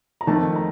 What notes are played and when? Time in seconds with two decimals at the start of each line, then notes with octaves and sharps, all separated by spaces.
0.21 A#5
0.27 F2 D#3 A3 A5
0.56 A#5